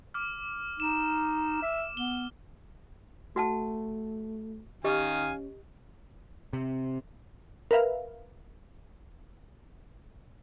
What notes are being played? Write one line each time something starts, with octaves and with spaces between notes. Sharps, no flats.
D6 F6
D#4 E7
E5
B3 G7
A3 F#4 F#5 A5
D#3 C#4 G4 D#5 F5 G#5
C3
A#4 B4 E5 F5